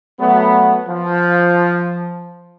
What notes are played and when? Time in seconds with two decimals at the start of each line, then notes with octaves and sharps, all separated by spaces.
0.20 F#3 A3 B3
0.89 F3